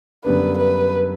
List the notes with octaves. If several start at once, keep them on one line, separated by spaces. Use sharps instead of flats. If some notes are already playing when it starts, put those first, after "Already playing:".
F#2 D3 G3 B3 D4 B4
B4